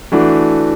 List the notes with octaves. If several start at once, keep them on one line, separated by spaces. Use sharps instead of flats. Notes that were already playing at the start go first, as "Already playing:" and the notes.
E3 A3 D4 F#4